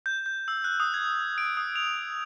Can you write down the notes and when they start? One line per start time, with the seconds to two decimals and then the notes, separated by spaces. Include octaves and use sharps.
0.06 G6
0.26 G6
0.48 E6
0.64 F#6
0.80 D#6
0.94 G#6
1.38 D7
1.57 D#6
1.76 F7